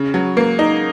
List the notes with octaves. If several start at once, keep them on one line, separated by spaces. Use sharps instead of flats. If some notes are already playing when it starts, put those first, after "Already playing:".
Already playing: C#3
F#3
A#3
D#4